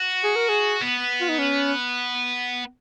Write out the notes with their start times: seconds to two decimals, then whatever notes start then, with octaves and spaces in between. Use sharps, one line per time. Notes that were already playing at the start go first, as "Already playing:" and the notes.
Already playing: F#4
0.24 G#4
0.36 A#4
0.49 G#4
0.81 B3
1.21 F4
1.29 D#4
1.39 C#4